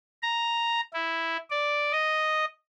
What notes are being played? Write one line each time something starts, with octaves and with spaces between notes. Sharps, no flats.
A#5
E4
D5
D#5